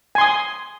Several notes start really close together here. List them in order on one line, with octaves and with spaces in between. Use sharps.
G#5 C6 D#6